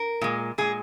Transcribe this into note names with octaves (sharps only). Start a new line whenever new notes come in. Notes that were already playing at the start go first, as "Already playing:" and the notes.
Already playing: A#4
A#2 G#3
A#2 G#3 G#4